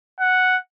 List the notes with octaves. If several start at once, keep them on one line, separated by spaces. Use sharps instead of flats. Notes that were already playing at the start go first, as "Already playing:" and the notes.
F#5